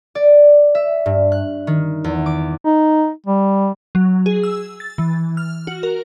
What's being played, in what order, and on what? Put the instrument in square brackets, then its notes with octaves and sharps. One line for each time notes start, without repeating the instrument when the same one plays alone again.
[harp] D5
E5
G2
F#6
D#3
E2
D6
[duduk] D#4
G3
[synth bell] F#3
G#4
E6
A6
E3
F6
F#4
A#4